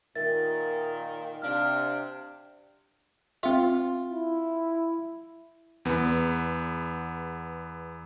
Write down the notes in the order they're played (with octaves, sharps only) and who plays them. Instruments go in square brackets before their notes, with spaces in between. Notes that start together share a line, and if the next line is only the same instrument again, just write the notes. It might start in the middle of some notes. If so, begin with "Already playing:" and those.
[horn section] A#2 D#3 [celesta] A#4 E5 A6
[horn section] C3 D4 [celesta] F5 F6
[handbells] C4 E5 [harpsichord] F4
[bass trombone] E4
[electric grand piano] E2 B3